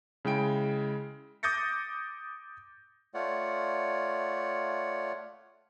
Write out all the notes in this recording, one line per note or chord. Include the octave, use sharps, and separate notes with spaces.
C#3 G#3 E4 G5 D7
D6 D#6 G6 A6 A#6 C#7
A3 F4 C#5 D5 F#5